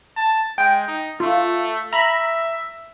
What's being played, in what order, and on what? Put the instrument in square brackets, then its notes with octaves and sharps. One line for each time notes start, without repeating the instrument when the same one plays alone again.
[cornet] A5
[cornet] G#3 [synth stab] G5
[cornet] D#4
[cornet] A3 [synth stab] F4
[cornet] E5 [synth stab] A#5 B5